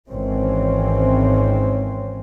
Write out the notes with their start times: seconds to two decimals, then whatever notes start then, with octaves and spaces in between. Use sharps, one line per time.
0.10 G#1 E3 C4 C#4